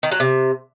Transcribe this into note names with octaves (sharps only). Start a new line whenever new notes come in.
D#3
F#3
C3